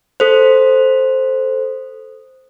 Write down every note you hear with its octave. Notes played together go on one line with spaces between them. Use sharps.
A4 C5